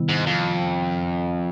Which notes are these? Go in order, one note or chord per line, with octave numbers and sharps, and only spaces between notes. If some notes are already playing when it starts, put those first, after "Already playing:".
Already playing: C3 D#3 G3 B3 E4
G#2
F2